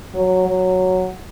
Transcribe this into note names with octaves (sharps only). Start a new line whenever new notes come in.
F#3
F#3